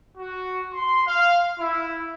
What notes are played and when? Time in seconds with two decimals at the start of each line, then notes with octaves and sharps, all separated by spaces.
0.16 F#4
0.72 C6
1.07 F5
1.58 E4